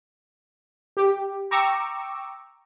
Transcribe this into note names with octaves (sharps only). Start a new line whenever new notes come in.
G4
G5 A#5 C#6 D6 E6